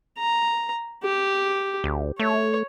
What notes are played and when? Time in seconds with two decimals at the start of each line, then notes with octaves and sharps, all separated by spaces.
0.18 A#5
1.04 G4
1.84 D2
2.20 A3 C#5